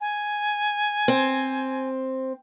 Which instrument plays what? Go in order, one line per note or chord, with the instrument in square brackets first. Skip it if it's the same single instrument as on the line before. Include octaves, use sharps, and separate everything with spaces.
[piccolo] G#5
[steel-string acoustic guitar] C4